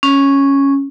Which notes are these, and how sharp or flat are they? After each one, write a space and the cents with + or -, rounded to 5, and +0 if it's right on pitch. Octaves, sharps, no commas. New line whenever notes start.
C#4 -5